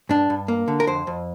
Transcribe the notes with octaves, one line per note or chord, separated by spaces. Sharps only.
G2 D4
G2
A#3
D3
A#4
F2 C5
F2